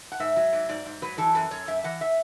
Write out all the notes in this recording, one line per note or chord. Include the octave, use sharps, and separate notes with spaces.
F#5
G#2 E5
F#3
G#2
G#2 D5
G#2
F#3 B4
E3 A4
F#2 B4
F#2 C#5
F#2 E5
E3 F#5
E5